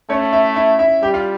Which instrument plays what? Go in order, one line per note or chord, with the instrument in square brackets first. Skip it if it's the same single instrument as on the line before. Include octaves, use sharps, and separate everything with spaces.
[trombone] A3 [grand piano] C#4 C#5
[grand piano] E4 E5
E4 E5
E4 E5
[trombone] G3 [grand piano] G4 G5
[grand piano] F4 F5